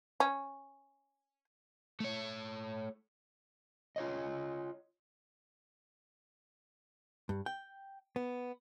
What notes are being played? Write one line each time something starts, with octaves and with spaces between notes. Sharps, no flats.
C#4
A3 C#5
F4 C#5 D#5
G2
G5
B3